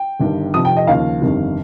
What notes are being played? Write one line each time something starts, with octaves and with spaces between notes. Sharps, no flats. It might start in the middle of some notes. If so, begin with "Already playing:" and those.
Already playing: G5
G1 G2 D#3
F1 F2 C3 F3 D#6
G5
D#5
D#2 C#3 F3 F5
G1 F2 D#3 G3